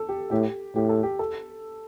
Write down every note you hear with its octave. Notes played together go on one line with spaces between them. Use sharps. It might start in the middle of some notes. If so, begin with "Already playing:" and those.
Already playing: A4
G4
A2 G4
A2 G4
A4
G4
A4